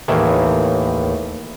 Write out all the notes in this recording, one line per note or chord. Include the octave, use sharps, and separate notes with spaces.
D#2 A2 D#3 E3